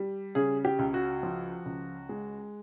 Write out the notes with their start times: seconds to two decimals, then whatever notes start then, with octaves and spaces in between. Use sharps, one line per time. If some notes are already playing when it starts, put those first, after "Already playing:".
Already playing: G3
0.35 C#3 G#4
0.65 G4
0.79 C#2
0.94 F#4
1.23 F3
1.66 C#2
2.09 G#3